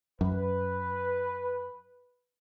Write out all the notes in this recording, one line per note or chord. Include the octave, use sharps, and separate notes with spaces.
F#2 B4